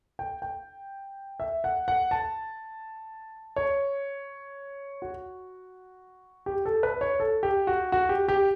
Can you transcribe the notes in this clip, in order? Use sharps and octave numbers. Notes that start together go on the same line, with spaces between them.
G5
G5
E5
F#5
F#5
A5
C#5
F#4
G4
A4
B4
C#5
A4
G4
F#4
F#4
G4
G4